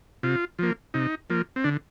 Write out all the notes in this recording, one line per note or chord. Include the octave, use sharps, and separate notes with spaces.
C3 F4
F3 A#3
C3 D#4
F3 A#3
C4
D3 D4